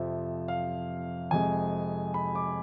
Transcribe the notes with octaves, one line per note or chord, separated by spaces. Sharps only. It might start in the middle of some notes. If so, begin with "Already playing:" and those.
Already playing: F2 C3 F3 E5
F5
F2 C3 G#3 G#5
B5
D6